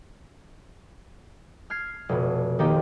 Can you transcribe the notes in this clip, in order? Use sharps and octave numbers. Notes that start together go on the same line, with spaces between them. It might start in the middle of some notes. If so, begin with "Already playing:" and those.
F6 G#6 C7
F1 B2
D#3 A#3 C4 D#4 G4